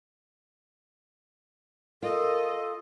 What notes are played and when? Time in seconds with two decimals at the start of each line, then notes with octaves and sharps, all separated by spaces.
2.03 F4 A4 A#4 D#5